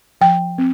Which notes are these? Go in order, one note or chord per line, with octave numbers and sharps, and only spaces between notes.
F3 G5
C4